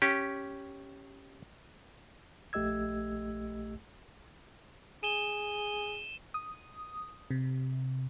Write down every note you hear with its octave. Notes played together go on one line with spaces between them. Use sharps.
C#4 G4
A#1 A3 G4 D#5 E6 G#6
G#4 D#7 E7 G7
D#6
C3